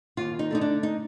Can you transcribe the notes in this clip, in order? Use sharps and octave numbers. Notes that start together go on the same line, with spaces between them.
D#2 F4
D#4
D3 A3 D#4
D4
D#4